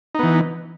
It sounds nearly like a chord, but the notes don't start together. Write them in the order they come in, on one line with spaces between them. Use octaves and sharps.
D#4 B3 E3